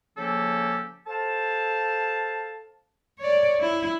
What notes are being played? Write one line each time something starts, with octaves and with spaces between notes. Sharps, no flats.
C#3 F3 A#3 C#4 G4 A4
A4 C5 F5 A5
C#5 D5
E4